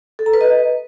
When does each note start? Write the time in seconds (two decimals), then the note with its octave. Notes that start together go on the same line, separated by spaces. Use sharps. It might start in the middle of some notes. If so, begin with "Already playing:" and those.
0.19 A4
0.26 A#5
0.33 B4
0.41 D#5